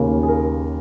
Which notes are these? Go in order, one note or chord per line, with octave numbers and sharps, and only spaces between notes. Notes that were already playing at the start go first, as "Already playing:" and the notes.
Already playing: D#2 C#3 A#3
G#4
A#4